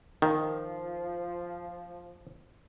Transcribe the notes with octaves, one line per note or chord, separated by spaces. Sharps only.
D#3 F3